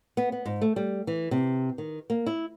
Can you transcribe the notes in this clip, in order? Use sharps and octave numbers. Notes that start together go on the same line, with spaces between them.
B3
B3
G#2
A3
G3
E3
C3
D#3
A#3
E4